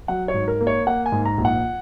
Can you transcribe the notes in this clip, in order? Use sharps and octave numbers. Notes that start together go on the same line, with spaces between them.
F#3 F#5
C#5
G#2
A#4
A#3
C#5
A#3 F#5
G#5
G#2
A#5
A#1
F#5